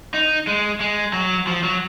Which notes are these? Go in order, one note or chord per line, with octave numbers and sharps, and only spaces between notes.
D#4
G#3
G#3
F#3
F3
F#3